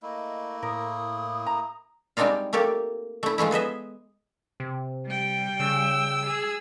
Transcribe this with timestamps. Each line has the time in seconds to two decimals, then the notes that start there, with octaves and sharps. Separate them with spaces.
0.03 A3 A#3 E4 D#5
0.62 A2 A#4 D#6
1.46 A#5
2.17 G3 G#3 C4 D4 D#4 F4
2.53 A3 A#3 G4 A4
3.23 A3 E4
3.38 F3 G#3 A3 E4
3.51 B3 G#4 D#5 E5
4.60 C3
5.06 G3 G5
5.60 C#3 E6
6.26 G#4